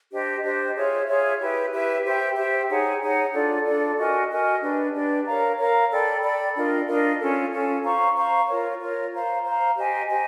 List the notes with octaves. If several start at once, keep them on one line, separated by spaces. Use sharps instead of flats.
D4 G4 C5 D#5
D4 G4 C5 D#5
F4 G#4 C#5 E5
F4 G#4 C#5 E5
E4 G4 B4 E5
E4 G4 B4 E5
G4 C5 E5 G5
G4 C5 E5 G5
D#4 G#4 C#5 F#5
D#4 G#4 C#5 F#5
D4 F4 A4 D5
D4 F4 A4 D5
F#4 A#4 D#5 G#5
F#4 A#4 D#5 G#5
D4 G4 B4
D4 G4 B4
A#4 C#5 F5 A#5
A#4 C#5 F5 A#5
A4 D5 G5 B5
A4 D5 G5 B5
D4 F4 A#4 D#5
D4 F4 A#4 D#5
C#4 F4 A4
C#4 F4 A4
C5 F5 A#5 C#6
C5 F5 A#5 C#6
F4 A#4 C#5
F4 A#4 C#5
C5 F5 A#5
C5 F5 A#5
G4 C5 D#5 G#5
G4 C5 D#5 G#5